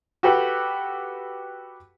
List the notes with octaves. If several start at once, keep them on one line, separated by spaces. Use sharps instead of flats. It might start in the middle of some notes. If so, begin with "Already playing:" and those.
F#4 G4 A4 B4